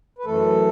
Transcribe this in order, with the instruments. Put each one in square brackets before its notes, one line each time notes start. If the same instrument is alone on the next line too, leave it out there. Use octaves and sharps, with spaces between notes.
[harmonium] B4
F#2 E3 A3 A4